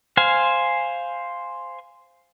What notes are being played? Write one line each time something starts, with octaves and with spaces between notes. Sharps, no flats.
C5 F5 G#5